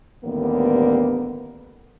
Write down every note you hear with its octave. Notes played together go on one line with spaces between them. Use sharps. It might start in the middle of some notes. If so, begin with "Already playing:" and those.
A1 D#2 D3 G3 A#3 B3